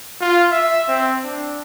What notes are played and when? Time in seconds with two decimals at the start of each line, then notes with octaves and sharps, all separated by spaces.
0.21 F4
0.51 E5
0.88 C4
1.24 D4